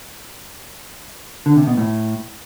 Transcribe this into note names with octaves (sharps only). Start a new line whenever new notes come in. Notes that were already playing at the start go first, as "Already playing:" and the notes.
D3
C3
B2
A2